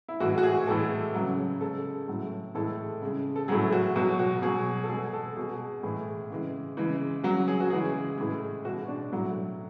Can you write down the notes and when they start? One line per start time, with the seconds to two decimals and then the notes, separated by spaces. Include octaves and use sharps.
0.08 E4
0.20 A2 E3 G#3 F#4
0.38 F#4
0.43 G#4
0.67 A2 E3 G#3 A4
1.15 C#3 F#3
1.61 C#3 G#3 A4
2.08 A2 F#3
2.55 A2 E3 G#3 A4
3.02 C#3 G#3
3.36 A4
3.48 A2 F#3 G#4
3.72 F#4
3.96 B2 F#3 F#4
4.19 F#4
4.42 B2 F#3 G#4
4.84 A4
4.89 B2 G#3 G#4
5.13 A4
5.36 B2 G#3 G#4
5.83 A2 E3 G#3 G#4
6.30 C#3 E3 G#3
6.77 C#3 E3 G#3
7.24 C#3 F#3 F#4
7.48 G#4
7.60 F#4
7.71 C#3 E3 G#3 G#4
8.18 A2 E3 G#3
8.65 G#3 F#4
8.68 B2
8.88 D4
9.12 A2 F#3